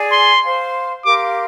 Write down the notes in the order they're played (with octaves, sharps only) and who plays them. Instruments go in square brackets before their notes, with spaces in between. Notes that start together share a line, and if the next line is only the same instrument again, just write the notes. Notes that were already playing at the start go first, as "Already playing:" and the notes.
Already playing: [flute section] G#4 D5 G#5
[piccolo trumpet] C6
[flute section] C5 F5 C6
[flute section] G4 A#4 F5 C6 [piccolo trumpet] D6